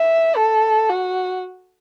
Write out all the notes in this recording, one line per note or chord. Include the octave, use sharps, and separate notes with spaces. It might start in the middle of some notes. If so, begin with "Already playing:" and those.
Already playing: E5
A4
F#4